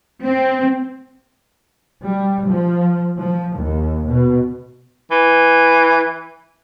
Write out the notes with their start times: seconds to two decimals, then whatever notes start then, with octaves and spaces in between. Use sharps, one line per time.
0.25 C4
2.03 G3
2.47 F3
3.19 F3
3.57 D#2
4.06 B2
5.11 E3